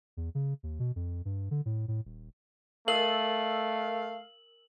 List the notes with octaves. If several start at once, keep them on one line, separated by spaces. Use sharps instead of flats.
E2
C#3
D#2
B2
F2
G2
D3
A2
A2
D#1
A3 A#4 F5 E6 F#7